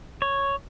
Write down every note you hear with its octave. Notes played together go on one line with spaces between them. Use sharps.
C#5